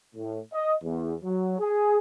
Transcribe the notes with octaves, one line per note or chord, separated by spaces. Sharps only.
A2
D#5
E2
F#3
G#4